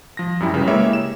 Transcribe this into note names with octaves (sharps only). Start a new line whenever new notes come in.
F3 A#6
F#2 G3 E4 G5
C#3 B4
G#3 A#3 E4 G4 C#5 E5
E7